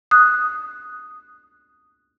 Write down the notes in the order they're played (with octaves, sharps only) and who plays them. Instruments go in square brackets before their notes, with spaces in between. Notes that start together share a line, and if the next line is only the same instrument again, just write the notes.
[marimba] D#6 F#6